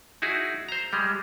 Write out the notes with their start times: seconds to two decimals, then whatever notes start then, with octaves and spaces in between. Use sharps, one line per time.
0.22 D#4 E4 F#4 G#4
0.69 C5 A#5
0.93 G3 G#3